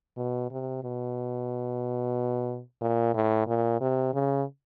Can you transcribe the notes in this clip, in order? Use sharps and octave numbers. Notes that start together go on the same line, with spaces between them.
B2
C3
B2
A#2
A2
A#2
C3
C#3